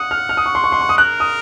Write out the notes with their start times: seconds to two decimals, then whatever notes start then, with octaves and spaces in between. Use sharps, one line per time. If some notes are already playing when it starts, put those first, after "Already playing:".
Already playing: F#5 D#6
0.11 F6
0.29 F6
0.37 D#6
0.46 C#6
0.55 C6
0.64 C#6
0.72 C6
0.81 C#6
0.89 D#6
0.98 A#4 F#6
1.20 D#6